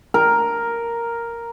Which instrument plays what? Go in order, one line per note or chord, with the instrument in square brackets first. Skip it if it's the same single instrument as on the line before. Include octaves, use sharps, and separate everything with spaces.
[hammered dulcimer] A#4